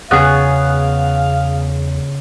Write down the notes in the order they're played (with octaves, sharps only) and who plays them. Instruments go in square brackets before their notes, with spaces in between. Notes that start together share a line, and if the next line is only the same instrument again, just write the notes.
[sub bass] E2 [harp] C#3 F#6 [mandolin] B3 G#4 [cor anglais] F5